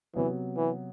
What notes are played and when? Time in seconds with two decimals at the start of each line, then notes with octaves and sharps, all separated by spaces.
0.15 C3 E3 F#3 B3
0.57 E3